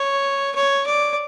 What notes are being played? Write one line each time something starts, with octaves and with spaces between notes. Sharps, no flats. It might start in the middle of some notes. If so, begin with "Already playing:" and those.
Already playing: C#5
C#5
D5